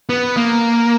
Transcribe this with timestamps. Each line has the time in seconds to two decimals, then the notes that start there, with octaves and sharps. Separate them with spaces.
0.09 B3
0.37 A#3